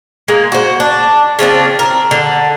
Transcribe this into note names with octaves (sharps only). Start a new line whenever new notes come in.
G#3 A#3
F#4 C5
D4
C#3 F3 C4 D4
C4 A#4
D3